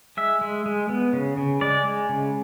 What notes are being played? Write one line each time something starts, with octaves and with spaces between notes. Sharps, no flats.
G#3 E5
G#3
G#3
B3
C#3
C#3
G#3 D5
G#3
C#3